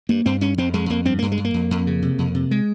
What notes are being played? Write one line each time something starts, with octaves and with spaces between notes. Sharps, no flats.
G2 A#3
G2 C4
G2 C#4
F2 C4
F2 G#3
F2 A#3
G2 C4
G2 A#3
G#3
G2
A#3
F2
F2
C#3
C3
F2
C3
G#3